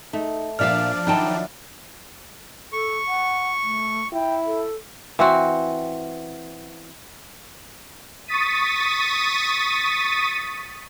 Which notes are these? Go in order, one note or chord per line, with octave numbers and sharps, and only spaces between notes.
A3 D#4
A#2 F3 D4 D5 E5 F5 F6
D#3 F#3 D#4 E4 G5 A5
A4 C#6
F#5
A3
E4 G5
A4
E3 C4 F#4
C#6 D#6 A6 B6 D#7